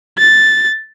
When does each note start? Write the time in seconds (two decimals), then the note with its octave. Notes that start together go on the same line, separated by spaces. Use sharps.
0.19 A6